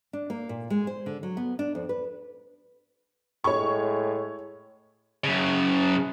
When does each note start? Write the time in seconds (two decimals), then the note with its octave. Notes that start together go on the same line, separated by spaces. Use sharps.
0.13 D4
0.30 A#3
0.49 A#2
0.70 G#3
0.87 C5
1.06 D3
1.23 F#3
1.37 B3
1.59 D4
1.75 F2
1.89 B4
3.44 A2 G#3 C#5 C#6
5.24 F#2 C#3